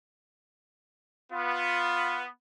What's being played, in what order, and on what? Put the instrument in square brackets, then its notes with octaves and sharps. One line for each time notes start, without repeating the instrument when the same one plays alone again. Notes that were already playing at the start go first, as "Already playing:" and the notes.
[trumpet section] B3 [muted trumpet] F4